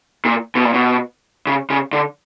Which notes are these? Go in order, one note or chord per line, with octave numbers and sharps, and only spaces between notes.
A#2
B2
A#2
B2
C#3
C#3
D3